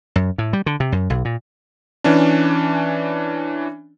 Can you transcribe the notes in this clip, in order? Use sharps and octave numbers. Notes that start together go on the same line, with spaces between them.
F#2
A2
G3
D3
C3
F#2
B1
A#2
E3 C#4 D4